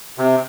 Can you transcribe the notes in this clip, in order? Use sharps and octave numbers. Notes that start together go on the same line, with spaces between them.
C3